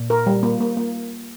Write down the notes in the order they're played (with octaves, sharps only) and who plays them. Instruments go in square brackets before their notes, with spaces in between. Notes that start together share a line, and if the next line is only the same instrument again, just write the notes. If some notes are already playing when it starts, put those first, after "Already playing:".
Already playing: [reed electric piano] A#2
[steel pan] A#4
G3
A#3
A#3
A#3